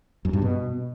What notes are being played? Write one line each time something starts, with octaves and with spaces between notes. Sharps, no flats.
F#2
G2
B2